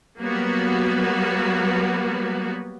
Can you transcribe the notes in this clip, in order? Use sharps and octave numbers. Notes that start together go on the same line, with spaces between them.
F#3 G3 A#3 B3 F#4